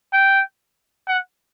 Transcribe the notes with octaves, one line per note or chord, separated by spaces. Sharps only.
G5
F#5